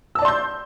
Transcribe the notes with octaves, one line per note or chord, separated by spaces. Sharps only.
D5 A5 C6 E6 G6